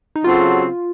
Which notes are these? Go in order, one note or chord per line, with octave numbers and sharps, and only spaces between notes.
D#4
C#3 F#3 C4 F4 F#4 A4